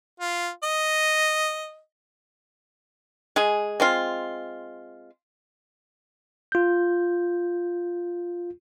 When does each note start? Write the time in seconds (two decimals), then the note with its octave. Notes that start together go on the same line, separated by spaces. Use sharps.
0.20 F4
0.64 D#5
3.36 G#3 G#4
3.80 G#3 C4 F4
6.52 F4 G6